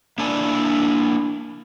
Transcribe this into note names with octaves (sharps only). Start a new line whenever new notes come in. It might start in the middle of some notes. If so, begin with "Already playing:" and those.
A#3 D4 E4 D5 G#5